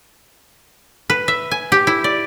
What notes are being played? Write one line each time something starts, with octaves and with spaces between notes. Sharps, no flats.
B4
E5
G#5
G4
E4
D5